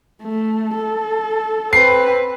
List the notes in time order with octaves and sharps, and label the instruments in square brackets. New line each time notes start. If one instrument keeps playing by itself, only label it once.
[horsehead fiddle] A3
A4
[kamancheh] C4 B4 [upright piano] C7